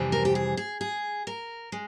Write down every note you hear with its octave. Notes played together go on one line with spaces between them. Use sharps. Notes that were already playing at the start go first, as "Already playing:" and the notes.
Already playing: F2 C3 E3 G3
A#4
G4
G#4
G#4
G#4
A#4
G#3